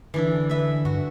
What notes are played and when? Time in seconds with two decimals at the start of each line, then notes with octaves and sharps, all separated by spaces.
0.14 D3 E3 D4 E4
0.49 B4 E5
0.85 G2 F#4